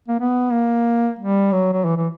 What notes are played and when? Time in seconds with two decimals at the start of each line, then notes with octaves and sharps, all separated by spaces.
0.08 A#3
0.20 B3
0.52 A#3
1.19 G3
1.52 F#3
1.73 F#3
1.85 E3
1.97 E3